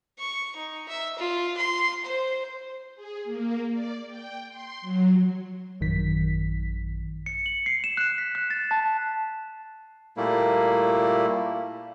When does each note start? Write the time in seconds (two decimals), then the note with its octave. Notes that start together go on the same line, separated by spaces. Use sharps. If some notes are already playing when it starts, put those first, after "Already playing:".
0.19 C#6
0.56 D#4
0.89 E5
1.18 F4
1.57 C6
2.05 C5
2.95 G#4
3.24 A#3
3.71 D5
4.07 G5
4.48 C6
4.81 F#3
5.81 A1 F#2 D#3 B6
7.26 C#7
7.46 F#7
7.66 C7
7.84 E7
7.97 F#6
8.18 B6
8.35 F#6
8.50 A6
8.71 A5
10.17 A#2 G3 A3 A#3 E4